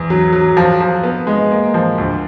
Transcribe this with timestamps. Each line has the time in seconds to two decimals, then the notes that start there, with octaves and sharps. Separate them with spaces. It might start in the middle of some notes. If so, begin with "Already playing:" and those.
Already playing: E2
0.10 F#3
0.33 F#3
0.57 F3
0.80 F3
1.04 B3
1.27 G#3
1.51 A#3
1.74 F3
1.98 D2